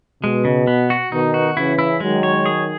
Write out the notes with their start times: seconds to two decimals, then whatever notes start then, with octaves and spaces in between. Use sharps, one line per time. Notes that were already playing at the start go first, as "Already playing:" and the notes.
0.22 B2 G#3
0.45 C#3
0.67 B3
0.90 F#4
1.12 B2 D#3 D#4
1.34 F#4
1.56 C#3 E3 E4
1.79 E4
2.00 D#3 F#3 G#3
2.23 C#5
2.46 G#4